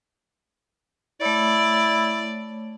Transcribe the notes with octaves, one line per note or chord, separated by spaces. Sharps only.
A3 E4 C#5 D5